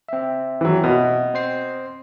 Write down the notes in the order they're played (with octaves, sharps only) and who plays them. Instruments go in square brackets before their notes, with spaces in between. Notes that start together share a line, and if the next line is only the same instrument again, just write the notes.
[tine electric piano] C4 E5
[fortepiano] E3 F#3
B2
[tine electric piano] C4 C5 C7